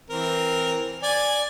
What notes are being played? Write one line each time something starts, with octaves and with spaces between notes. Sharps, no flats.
E3 C4 A#4
D5 G#5